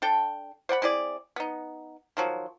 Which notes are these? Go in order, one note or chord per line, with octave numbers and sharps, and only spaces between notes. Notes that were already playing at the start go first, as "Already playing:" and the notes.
D4 A4 G5
C5 D5 F#5 B5
C4 E4 G#4 D5
B3 D#4
D#3 F3 F#3